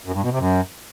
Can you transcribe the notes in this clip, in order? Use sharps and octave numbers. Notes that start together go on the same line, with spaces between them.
F#2
G2
B2
C3
F#2